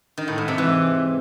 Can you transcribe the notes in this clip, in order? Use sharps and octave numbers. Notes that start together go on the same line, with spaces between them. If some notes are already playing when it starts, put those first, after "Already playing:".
D#3
A2
G#2
C3
E3